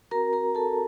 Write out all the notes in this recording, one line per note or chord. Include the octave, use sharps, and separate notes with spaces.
C4 F#4 A#4 A#5
A#4 A#5
A4 A5